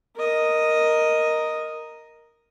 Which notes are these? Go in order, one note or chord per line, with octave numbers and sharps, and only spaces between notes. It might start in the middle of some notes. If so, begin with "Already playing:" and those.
A#4 D#5